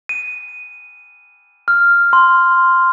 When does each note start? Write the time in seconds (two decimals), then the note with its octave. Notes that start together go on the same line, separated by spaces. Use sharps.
0.09 D#7
1.68 F6
2.13 C6